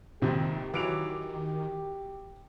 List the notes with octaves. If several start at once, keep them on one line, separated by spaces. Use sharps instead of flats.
A#1 F2 G#2 C3 D#3 G4
E3 F#3 D6 D7 F7